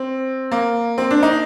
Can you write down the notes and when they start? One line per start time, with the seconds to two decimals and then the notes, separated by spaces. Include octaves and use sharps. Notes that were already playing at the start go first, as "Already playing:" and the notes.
Already playing: C4
0.51 A#3
0.98 C4
1.11 D4
1.23 D#4